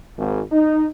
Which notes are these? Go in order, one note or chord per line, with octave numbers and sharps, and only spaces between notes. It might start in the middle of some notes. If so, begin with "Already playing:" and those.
G#1
D#4